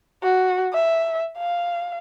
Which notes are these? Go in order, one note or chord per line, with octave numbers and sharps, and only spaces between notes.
F#4
E5
F5